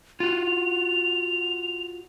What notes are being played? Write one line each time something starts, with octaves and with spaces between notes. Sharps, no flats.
F4 F#4 F7